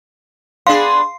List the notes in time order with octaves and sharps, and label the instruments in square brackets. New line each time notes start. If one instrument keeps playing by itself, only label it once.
[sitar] B3 D4 G#4 [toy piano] F5 [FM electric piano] C6